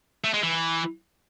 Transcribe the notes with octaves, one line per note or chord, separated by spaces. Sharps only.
A3
G#3
E3